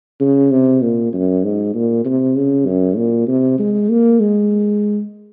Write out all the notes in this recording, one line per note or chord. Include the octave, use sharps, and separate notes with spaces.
C#3
C3
A#2
F#2
G#2
A#2
C3
C#3
F#2
A#2
C3
G#3
A#3
G#3